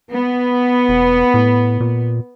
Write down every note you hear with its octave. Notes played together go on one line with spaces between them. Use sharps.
B3
E1
A2
A#2